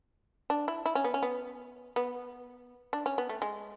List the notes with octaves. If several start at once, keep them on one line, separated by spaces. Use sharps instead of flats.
D4
E4
E4
C#4
B3
C#4
B3
B3
D4
C#4
B3
A3
G#3